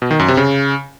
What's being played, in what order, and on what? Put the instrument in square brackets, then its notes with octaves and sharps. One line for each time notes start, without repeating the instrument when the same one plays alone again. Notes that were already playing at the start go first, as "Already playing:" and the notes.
[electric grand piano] B2
D#3
F#2
C3
C#3